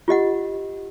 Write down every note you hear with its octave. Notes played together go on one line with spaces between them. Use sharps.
F4 G4 D#5 F#5